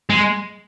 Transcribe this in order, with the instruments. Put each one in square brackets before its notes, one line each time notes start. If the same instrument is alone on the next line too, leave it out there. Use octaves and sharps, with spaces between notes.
[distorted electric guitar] G#3